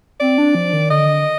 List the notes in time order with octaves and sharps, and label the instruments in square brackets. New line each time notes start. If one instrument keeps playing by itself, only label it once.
[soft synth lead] C4 [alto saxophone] D5
[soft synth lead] D4
F3
D#3
[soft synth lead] D3 [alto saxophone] D#5